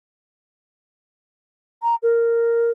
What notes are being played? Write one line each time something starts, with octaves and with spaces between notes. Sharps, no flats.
A#5
A#4